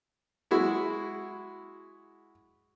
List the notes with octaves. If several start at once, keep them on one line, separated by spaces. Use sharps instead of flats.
G#3 E4 F#4